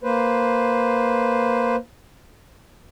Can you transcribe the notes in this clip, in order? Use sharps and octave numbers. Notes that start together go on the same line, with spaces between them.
A#3 B4 C5